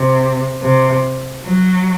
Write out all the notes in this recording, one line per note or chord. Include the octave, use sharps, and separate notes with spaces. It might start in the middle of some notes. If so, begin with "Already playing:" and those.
Already playing: C3
C3
F#3